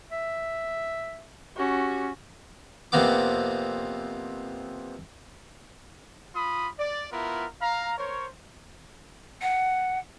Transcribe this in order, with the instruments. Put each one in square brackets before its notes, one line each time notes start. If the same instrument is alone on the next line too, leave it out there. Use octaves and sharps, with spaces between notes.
[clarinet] E5
[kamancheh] C#4 F#4 [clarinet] G4
[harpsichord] F2 C3 A#3 B3 D6
[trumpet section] F4 B5 D#6
D5
B3 E4 F4 A#4
F5 A#5
A#4 C5 C#5
[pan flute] F#5